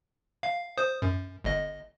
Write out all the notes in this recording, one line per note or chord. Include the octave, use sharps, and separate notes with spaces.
F5
C5 D#6
F#2
G1 D#5